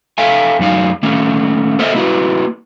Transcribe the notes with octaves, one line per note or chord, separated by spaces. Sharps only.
A4 E5 F5 G5 G#5
F#2 F#3 D#4 F5
D#3 A3 A#3 C#4
A4 A#4 C5 D#5 E5
A#3 E4 F#4 B4